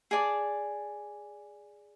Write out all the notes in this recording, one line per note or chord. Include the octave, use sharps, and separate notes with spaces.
G#4 D5 A5